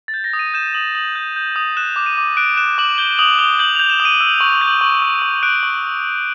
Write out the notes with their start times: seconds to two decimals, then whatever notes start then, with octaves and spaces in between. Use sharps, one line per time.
0.08 A6
0.14 G6
0.24 A#6
0.33 D#6
0.39 D#7
0.54 G6 E7
0.74 D#6 F#7
0.95 D#6 F#7
1.15 G6
1.36 G6
1.56 D#6
1.77 F#6 E7
1.96 D6
2.06 D#7
2.18 D6
2.37 F#6 D7
2.57 F#6 E7
2.78 D6 F#7
2.98 G6 G7
3.19 D#6 F#7
3.39 D#6 G7
3.59 G6 F#7
3.75 G6 F7
3.90 E7
4.00 D#6
4.05 D#7
4.21 E6
4.40 C#6
4.61 G6
4.81 C#6
5.02 E6
5.22 C#6
5.43 F#6 D7
5.63 C#6